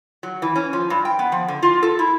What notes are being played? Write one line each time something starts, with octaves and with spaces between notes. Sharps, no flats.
F#3
E3
C#4
F3
G2
G5
B3
F3
D3
F4
A4
E4